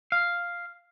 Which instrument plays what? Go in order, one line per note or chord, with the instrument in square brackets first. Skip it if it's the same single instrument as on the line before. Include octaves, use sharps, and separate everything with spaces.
[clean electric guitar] F5